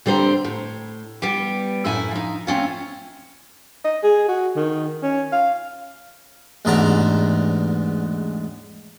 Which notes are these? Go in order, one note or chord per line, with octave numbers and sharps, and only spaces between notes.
D3 G3 C4 C5 A#5
A2
G3 B3 G4
F#2 A2 E4 E5 G#5
F3 D#4
A3 C4 C#4 F4
D#5
G#4
F#4
D#3
C#4
F5
A1 E2 G#2 D3 A5 A#5